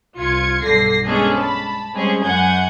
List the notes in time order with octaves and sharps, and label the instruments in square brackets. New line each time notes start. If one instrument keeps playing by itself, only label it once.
[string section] C2 F4 G#6 C#7
B1 G2 D3 A#6 C7
G#3 B3 C#4 D4 G#4 A4
A5 B5
G3 G#3 C4 C#4 G#4
F#2 F#5 G#5 G6 G#6